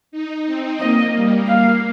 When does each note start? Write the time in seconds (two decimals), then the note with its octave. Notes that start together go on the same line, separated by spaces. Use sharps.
0.12 D#4
0.46 C4
0.80 A#3 D#5
1.15 G3
1.48 A#3 F5